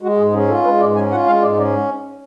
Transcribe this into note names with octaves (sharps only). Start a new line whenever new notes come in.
G#3 F#4
G#2 G#4
C#4 G#4
F4 A4
G#3 B4
G#2 D5
C#4 G#5
F4 F#5
G#3 F5
G#2 D5
C#4 D5